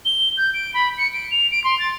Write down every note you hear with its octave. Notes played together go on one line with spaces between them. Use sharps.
G7
G6
D7
B5
C#7
D7
F7
D7
C6
A6